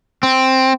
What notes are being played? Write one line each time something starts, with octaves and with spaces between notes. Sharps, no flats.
C4